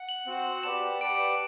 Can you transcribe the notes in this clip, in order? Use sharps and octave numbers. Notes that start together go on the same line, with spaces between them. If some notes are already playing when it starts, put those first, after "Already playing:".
Already playing: F#5
F#7
C4 F#4 C5 F#5
G4 B4 D5 F#5 A5 E7
G4 B4 D5 F#5 A5 D7